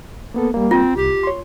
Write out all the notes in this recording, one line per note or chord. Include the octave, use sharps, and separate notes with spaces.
A#3 B3 A4
G3 A#3
C4 F4
C2 G4
C#5 C6